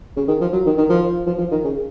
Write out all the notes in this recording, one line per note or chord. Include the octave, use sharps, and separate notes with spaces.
C#3
D#3
F3
F#3
D#3
D#3
F3
F3
F3
D#3
C#3